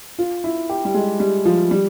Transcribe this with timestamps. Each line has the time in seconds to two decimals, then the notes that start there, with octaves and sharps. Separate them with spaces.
0.19 F4
0.44 E4
0.69 G4
0.85 G3
0.94 G#3
1.20 G3
1.45 F3
1.71 G3